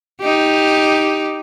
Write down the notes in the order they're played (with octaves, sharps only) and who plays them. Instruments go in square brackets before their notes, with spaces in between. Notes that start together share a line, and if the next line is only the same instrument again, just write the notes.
[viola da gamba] D#4 G4